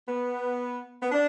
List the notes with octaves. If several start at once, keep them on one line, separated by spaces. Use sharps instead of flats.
B3
B3
D4